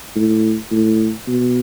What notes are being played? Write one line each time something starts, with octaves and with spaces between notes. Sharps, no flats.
A2
A2
B2